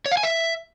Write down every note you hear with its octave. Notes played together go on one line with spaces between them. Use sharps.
C#5
F5
G#5
E5